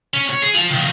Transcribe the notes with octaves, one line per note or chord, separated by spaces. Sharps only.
C#4
C#5
G#4
F4 A5
D#3 F3